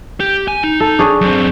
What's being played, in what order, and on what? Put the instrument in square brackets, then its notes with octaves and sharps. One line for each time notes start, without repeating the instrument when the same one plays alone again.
[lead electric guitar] G4
G#5
D#4
[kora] A4
D4 G#4 C#5
[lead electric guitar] F#2 C4